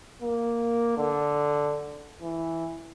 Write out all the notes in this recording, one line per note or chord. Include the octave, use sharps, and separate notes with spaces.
A#3
D3
E3